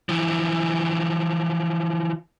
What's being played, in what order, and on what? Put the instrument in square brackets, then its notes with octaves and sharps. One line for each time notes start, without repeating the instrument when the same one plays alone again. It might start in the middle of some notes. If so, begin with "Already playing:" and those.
[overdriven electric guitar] E3 F3